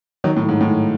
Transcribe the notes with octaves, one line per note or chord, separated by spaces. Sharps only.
D#3 F#3
A2
G#2
A2